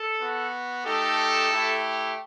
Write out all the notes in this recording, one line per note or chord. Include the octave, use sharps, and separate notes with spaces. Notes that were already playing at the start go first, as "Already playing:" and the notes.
Already playing: A4
B3 F#4
A3 D#4 G4 A4
A3 E4 G4